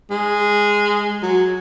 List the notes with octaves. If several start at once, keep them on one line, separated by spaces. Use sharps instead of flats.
G#3
F#3